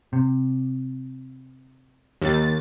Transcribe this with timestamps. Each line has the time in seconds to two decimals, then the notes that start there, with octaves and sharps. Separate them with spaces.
0.13 C3
2.22 D#2 A6